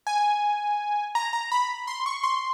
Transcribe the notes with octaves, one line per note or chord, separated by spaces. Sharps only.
G#5
A#5
A#5
B5
C6
C#6
C6